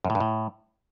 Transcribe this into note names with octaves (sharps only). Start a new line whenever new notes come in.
F#2
A2
G2
A2